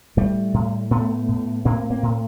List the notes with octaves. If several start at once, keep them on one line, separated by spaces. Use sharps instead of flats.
A2 G3 A3
A2
A2 A3 B3
A2
A2 A#3 C4
A#3 C4
A2